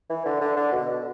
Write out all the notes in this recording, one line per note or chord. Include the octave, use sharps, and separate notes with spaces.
E3
D3
D3
D3
B2